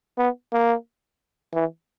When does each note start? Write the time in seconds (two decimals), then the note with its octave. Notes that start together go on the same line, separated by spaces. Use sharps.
0.18 B3
0.53 A#3
1.54 E3